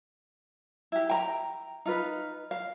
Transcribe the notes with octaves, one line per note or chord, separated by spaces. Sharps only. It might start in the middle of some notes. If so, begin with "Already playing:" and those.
E4 G4
G5 A#5
D#4 F4 B4
F5